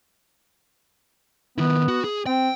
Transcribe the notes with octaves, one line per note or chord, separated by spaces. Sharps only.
D#3 B3 E4
F#4
G#4
C4 G5